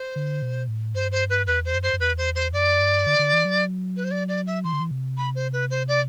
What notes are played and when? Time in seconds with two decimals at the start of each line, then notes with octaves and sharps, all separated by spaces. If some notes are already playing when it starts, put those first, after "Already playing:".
Already playing: C5
0.16 D3
0.42 B2
0.68 A2
0.94 G2 C5
1.12 C5
1.30 B4
1.47 E2 B4
1.65 C5
1.74 F#2
1.83 C5
1.93 F#2
2.00 E2 B4
2.18 C5
2.35 C5
2.53 F#2 D5
2.80 G2
3.06 D3
3.19 D3
3.33 E3
3.45 F#3
3.97 B4
4.04 C5
4.11 D5
4.29 D5
4.47 E5
4.64 E3 C6
4.73 D3
4.80 E3
4.91 C3
5.17 B5
5.35 C5
5.53 B4
5.71 C5
5.88 D5